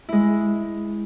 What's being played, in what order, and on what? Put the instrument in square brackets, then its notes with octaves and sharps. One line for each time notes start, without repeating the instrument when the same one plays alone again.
[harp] G#3 E4